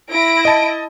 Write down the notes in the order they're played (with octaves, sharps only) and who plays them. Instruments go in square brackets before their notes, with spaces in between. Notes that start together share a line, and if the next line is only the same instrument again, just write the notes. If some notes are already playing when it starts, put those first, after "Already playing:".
[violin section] E4 A#6 D7
[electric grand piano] D#5 A5